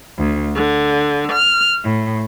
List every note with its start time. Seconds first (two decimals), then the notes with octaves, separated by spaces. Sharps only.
0.17 D2
0.54 D3
1.31 F6
1.84 A2